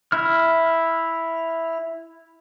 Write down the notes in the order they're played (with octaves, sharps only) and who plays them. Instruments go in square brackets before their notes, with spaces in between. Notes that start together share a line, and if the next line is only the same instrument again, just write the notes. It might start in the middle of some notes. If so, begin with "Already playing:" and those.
[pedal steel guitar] E4 F6